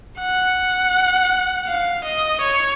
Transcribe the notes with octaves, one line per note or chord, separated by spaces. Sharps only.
F#5
F5
D#5
C#5